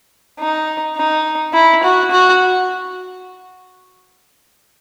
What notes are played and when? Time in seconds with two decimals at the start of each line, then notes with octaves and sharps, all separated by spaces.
0.40 D#4
0.97 D#4
1.53 E4
1.83 F#4
2.11 F#4